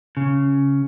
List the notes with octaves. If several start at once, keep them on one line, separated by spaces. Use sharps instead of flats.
C#3